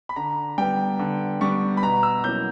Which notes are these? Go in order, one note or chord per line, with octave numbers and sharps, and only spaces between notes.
B5
D3 A#5
G3 B3 G5
D3
G3 B3 C#6
B5
B2 A#5
E6
F#3 A#3 C#4 E4 G6